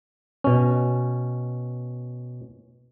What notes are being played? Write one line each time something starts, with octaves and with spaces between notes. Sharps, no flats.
B2 C#4